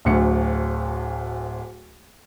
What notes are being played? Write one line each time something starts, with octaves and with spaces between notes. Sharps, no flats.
D1 D2 C#7